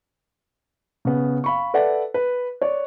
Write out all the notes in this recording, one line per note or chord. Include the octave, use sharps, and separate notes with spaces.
C#3 B3
F5 B5 C#6
A4 B4 D5 E5 F#5
B4
C#5 D5